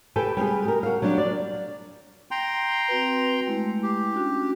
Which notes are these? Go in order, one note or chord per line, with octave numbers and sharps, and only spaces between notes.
G4 A4 B4 G5 G#5
G3 G#3 G4 G#4
G4 A#4
F#4 F5
F#3 G3 D4 G4
D5
G5 A#5 C6
C4 F#4 B4
G#3 A3 E4
G4
C#4 D4 F#4